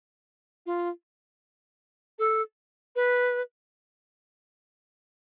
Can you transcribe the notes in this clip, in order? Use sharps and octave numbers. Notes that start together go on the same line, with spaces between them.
F4
A4
B4